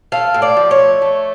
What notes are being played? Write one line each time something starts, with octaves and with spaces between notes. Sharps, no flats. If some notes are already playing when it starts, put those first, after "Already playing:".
A3 F5
A2
D5
F3
C#5
A3
A3